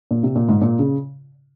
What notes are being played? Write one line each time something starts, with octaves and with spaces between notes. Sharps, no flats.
A#2
C3
A#2
G#2
A#2
C#3